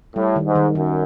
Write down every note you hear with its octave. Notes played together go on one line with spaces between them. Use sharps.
A2 G3
D#3
G#2
D#3
F#2 D#3